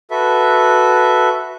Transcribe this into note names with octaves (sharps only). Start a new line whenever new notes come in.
F#4 A4 B4 E5